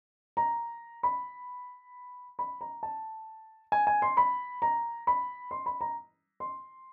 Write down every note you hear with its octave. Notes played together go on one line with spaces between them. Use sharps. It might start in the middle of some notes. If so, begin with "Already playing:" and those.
A#5
B5
B5
A#5
A5
G#5
G#5
C6
B5
A#5
B5
C6
B5
A#5
C6